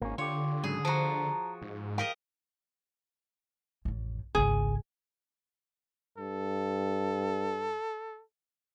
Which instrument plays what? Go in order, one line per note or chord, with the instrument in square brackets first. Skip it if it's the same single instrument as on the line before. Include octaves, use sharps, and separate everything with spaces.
[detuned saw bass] G#1 [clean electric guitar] A#3 C#4
[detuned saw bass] D3 [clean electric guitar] F4 G4 [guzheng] C#5
[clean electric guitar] G#2 C#3 F#3 [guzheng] G#4
[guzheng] F3 F#4 [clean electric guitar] A5 A#5
[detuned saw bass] G#2
[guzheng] G4 A#4 D#5 [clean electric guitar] F5
[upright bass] A1 F2
[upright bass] G#1 C#2 [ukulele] G#4
[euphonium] G2 [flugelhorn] A4